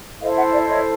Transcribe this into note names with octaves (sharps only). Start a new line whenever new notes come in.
E4 A4 C5 D#5 F5
E5 F#5
D5 E5
C#5 D#5